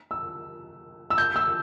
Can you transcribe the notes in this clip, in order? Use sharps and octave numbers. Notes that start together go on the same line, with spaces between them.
E6
E6
G6
E6